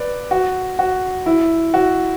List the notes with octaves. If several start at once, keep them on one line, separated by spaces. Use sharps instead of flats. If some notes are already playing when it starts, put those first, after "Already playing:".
Already playing: B4 D5
F#4
F#4
E4
F#4